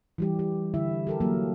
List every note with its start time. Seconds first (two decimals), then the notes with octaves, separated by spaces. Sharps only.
0.18 E3 G3 G4
0.39 G4
0.74 D3 E4 E5
1.07 G4 A4 A#4
1.20 F#3 A#3 A#4